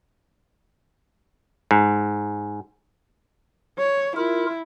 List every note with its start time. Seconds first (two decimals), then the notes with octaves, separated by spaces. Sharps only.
1.71 G#2
3.79 C#5
4.16 E4 F4 A#4